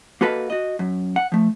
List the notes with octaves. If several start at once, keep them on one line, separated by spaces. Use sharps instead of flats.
A#3 F#4 A4 B4 D#5 F5
F#4 D#5
F#2
F#5
F3 A3